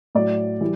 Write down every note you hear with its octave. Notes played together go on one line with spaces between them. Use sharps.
A2 F#3 D5
E3 G3